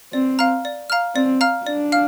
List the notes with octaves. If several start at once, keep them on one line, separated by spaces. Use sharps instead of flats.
C4 D5
F5 A#5 F6
D5
F5 A#5 F6
C4 D5
F5 A#5 F6
D4 D5
F5 F6